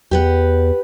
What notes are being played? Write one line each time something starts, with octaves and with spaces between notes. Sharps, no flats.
E2 G4 B4 F#5